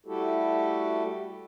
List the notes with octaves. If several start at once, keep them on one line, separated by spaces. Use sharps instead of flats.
G3 A3 E4 F#4 G4 A4